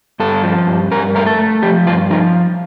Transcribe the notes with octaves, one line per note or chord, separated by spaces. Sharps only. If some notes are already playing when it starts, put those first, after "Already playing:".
G2 A4
F3
G2
G2 A#4
A3 A#4
A4
A3
F3 G4
G2 F4
F3 D#4